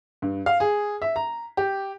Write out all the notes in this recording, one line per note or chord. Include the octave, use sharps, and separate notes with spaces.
G2
F5
G#4
E5
A#5
G4